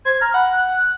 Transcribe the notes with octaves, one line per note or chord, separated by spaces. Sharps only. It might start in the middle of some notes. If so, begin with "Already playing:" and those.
C5 G#6
A#5 F6
F#5 B5
F#6